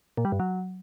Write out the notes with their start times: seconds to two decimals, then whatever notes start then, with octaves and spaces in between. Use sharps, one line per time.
0.17 A#2
0.25 G3
0.32 G2
0.40 F#3